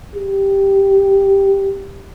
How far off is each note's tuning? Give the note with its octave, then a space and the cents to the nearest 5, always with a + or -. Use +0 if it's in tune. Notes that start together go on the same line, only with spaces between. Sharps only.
G4 +0